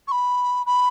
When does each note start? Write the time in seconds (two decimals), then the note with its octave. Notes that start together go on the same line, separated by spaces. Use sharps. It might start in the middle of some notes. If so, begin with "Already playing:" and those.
0.07 C#6
0.11 B5
0.66 B5